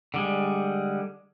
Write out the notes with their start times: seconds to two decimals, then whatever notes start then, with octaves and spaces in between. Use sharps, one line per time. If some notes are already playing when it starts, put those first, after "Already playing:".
0.14 D3 G3 G#3